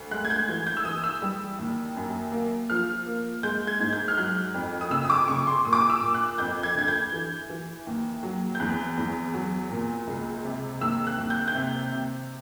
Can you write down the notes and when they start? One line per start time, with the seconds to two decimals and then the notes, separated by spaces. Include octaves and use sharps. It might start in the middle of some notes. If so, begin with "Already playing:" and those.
Already playing: D2
0.11 G#3 F#6
0.25 G#6
0.30 G6
0.48 E3 G#6
0.67 G6
0.77 E6
0.85 E3 D#6
1.04 E6
1.22 G3
1.59 D#2
1.96 F#2
2.32 A#3
2.70 F3 F6
3.06 A#3
3.43 G#3 G6
3.67 G#6
3.80 G#2
3.93 G6
4.08 F6
4.17 F#3 F#6
4.54 F2
4.81 D#6
4.90 C#3 E6
5.05 D#6
5.10 D6
5.28 C#3 C#6
5.47 C6
5.65 A#2 D#6
5.73 D6
5.80 D#6
5.90 E6
6.01 A#2
6.14 F#6
6.38 F2 G6
6.63 G#6
6.75 D3 G#6
6.88 G6
7.13 E3
7.49 E3
7.87 D#2
8.23 F#3
8.55 G6
8.60 E2 F#6
8.97 E2
9.34 F#3
9.71 A#2
10.07 C#2
10.45 C3
10.81 D#2 E6
11.07 F#6
11.19 D#2
11.30 G6
11.39 F#6
11.48 G6
11.55 C3
11.92 C3